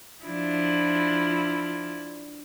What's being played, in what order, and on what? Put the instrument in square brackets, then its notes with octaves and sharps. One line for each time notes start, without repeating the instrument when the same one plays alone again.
[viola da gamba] F3 D4 E4